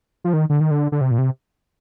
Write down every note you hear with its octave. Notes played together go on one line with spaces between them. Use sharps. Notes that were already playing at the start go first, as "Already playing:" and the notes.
F3
D#3
D3
D#3
D3
D3
C3
A#2
C3